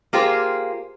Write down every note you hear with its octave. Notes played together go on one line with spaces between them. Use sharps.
A#3 F4 G4 G#4 C5